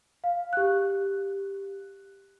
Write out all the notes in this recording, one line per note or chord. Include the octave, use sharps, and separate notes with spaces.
F5
G4 F#6